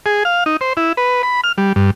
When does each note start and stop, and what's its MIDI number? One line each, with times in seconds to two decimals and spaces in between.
0.06 0.23 68
0.25 0.44 77
0.46 0.57 63
0.61 0.73 72
0.77 0.93 64
0.97 1.22 71
1.23 1.41 83
1.44 1.52 89
1.58 1.73 55
1.76 1.90 43